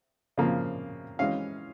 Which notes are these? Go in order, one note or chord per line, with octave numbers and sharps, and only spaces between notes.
C#3 F3 A#3
E3 G#3 C#4 F5